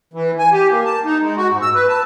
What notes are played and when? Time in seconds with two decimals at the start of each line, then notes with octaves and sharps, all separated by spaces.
0.14 E3
0.39 G#5
0.52 G4
0.70 A#3
0.85 A5
1.05 D#4
1.20 G#3
1.37 F#4
1.51 G#2
1.62 E6
1.75 B4
1.89 A5